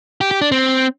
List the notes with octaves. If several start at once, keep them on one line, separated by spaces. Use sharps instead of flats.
G4
G4
D4
C4